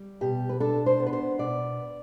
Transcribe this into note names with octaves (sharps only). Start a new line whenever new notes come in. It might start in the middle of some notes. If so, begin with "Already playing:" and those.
Already playing: G3
B2 G4
B4
D4 A4
C5
B3
B4
C5
B2 D5